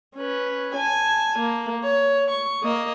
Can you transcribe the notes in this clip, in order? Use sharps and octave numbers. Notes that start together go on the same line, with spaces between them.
C#4 B4
G#5 A5
A#3
C#5
C#6
A#3 D#5